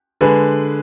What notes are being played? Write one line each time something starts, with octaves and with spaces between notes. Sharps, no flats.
D3 G#3 B4